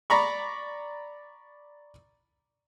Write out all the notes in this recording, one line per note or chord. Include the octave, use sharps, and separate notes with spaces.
D5 A#5 B5 C#6